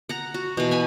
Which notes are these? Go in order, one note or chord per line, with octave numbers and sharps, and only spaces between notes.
F#5 A#5
F#4
B2 E3 B4
G#5 A5 B5